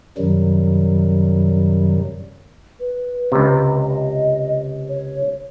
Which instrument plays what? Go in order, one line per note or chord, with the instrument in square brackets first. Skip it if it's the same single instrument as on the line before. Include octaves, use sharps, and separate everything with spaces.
[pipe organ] F#2 C3 D#3 F#3 G3
[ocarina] B4
[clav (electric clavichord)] C#2 C3
[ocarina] D#5
C#5